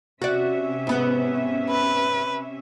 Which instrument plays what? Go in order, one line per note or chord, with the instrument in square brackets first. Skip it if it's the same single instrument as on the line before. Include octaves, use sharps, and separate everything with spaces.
[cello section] C3 C#4 E5 [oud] F#4 D5
[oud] G#2 B3
[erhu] B4